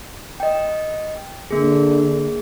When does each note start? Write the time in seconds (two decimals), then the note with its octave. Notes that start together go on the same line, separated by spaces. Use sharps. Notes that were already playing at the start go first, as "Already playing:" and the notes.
0.40 D#5 G5
1.51 D3 A#3 G#4